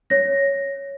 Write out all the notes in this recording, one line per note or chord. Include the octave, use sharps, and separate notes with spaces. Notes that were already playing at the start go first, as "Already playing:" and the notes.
C#5 A#6